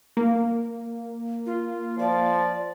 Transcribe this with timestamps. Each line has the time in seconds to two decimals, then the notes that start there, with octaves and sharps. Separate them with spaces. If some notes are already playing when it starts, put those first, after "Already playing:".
0.17 A#3
1.46 F4
1.99 F3 D5